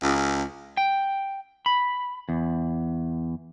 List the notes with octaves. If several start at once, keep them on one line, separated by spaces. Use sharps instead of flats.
C#2
G5
B5
E2